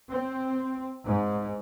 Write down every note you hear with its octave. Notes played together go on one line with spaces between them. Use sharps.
C4
G#2